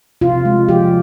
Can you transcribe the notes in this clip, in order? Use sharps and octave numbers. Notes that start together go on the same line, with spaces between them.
C3 F4
G#3
F3 G4